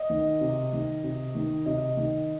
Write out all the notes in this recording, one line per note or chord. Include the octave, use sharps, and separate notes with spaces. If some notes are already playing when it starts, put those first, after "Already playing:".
Already playing: D#5
D#3
C3
D#3
C3
D#3
C3 D#5
D#3